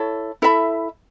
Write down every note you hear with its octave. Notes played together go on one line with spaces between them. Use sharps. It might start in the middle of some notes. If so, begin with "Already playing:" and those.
Already playing: E4 A4 C#5
E4 A4 E5 B5